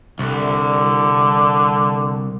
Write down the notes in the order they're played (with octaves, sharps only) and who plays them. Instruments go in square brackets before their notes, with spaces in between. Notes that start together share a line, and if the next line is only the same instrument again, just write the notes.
[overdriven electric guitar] C2 [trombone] D3